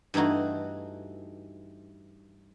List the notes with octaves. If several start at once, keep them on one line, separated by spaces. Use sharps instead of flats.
G2 E3 A3 D#4 F#4